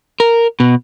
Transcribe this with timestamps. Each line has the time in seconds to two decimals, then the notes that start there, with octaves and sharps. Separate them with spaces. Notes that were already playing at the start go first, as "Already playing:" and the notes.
0.20 A#4
0.60 B2